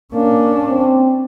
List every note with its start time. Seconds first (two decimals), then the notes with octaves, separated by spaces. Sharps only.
0.14 A#3 C#4 D4
0.70 C4